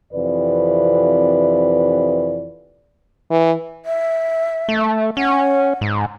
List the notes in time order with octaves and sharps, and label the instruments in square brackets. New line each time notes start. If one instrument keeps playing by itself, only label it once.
[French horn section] F2 C3 E3 B4 D5
[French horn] E3
[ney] E5
[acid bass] A3
[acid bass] C#4 [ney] F#5
[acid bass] G#2